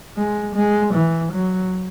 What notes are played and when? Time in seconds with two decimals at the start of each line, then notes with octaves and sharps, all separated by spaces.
0.17 G#3
0.55 G#3
0.94 E3
1.32 F#3